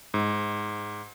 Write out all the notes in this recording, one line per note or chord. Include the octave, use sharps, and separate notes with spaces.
G#2